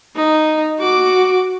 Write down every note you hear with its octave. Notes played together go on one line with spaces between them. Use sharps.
D#4
F#4 D6